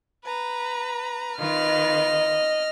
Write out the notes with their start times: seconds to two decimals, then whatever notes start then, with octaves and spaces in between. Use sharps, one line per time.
0.24 B4 A#5
1.39 D#3 F4 B4 D#5 F6